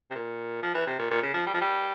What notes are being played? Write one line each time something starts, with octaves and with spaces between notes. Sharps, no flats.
C3
A#2
F3
E3
C3
A#2
A#2
C#3
F3
G3
F3
G3